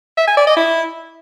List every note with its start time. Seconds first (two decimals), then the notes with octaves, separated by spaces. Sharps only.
0.17 E5
0.27 G#5
0.37 D5
0.47 D#5
0.57 E4